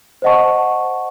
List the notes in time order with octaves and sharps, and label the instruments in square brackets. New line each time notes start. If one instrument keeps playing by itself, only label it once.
[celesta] C5 D#5 F#5 A5 C#6